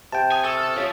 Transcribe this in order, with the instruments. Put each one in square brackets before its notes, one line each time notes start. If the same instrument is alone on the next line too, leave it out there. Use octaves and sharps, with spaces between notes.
[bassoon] C3 [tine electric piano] G5 A5
[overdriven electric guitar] G#5 [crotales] D#6
[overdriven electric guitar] A4 [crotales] C#6 E6 [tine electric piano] D#6
[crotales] F6 A6
[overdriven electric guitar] F3 [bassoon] C#4